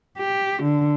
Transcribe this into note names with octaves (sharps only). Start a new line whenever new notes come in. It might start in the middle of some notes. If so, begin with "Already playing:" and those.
G4
D3